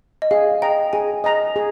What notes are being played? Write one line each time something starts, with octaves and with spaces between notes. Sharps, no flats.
D#5
G#4 F5
D#5 G5 A#5
G#4 G#5
D#5 A#5
G#4